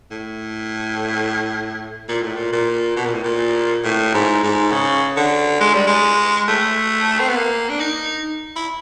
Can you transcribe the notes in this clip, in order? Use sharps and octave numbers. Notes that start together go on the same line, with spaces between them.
A2
A#2
A2
A#2
A#2
B2
A#2
A2
A#2
A2
G#2
G#2
C#3
D3
G#3
G3
G#3
A3
C4
B3
A#3
D4
D#4
E4